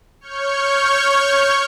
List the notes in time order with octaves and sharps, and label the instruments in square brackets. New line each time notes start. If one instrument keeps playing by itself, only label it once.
[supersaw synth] C#5 C#6 F6 G6